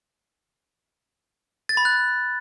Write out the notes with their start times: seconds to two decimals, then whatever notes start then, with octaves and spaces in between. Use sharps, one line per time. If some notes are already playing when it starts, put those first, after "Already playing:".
1.69 A6
1.77 B5
1.85 F#6